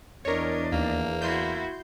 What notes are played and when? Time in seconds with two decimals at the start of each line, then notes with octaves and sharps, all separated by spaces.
0.25 E2 D4 A#4 C#5 D#5
0.72 D#2 A#3
1.22 E4 F#4 C6 G6